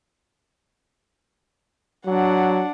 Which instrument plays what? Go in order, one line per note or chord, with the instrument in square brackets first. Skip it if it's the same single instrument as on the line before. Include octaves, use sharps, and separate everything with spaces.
[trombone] F#3 [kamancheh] D4 F#5